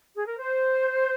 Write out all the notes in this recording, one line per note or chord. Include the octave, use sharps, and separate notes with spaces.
G#4
A#4
C5